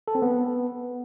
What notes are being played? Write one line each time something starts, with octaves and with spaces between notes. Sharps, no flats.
A4
C4
B3